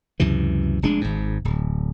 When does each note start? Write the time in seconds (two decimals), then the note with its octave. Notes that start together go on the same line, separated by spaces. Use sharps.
0.20 C#2 F#2 C3 E3
0.82 F1 G#3 D4
1.01 G#1 G#2
1.45 D1